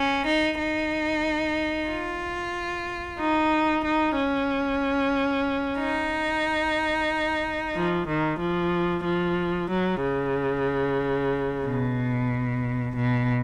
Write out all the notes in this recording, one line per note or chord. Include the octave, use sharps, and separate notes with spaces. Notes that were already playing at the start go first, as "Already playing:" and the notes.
Already playing: C#4
D#4
D#4
F4
D#4
D#4
C#4
D#4
F3
D#3
F3
F3
F#3
C#3
B2
B2